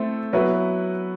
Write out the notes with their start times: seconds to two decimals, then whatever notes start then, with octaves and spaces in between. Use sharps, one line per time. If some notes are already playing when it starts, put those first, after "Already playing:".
Already playing: A3 C4 E4 A4
0.33 F#3 B3 E4 B4